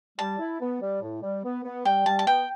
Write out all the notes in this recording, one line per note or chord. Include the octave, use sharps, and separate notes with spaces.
G3 A5
E4
B3
G3
A2
G3
B3
B3
G3 G5
G3 A5
A5
B3 G5